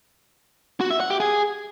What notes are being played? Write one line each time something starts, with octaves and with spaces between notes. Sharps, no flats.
F#4
E5
F#5
G4
G#4